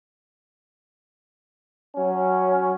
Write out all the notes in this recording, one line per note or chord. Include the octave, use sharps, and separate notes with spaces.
F#3 C#4